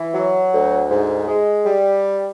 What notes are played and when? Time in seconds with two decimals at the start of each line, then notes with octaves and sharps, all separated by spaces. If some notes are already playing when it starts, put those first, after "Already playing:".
Already playing: E3
0.14 F#3
0.53 D2
0.90 G#2
1.28 G#3
1.66 G3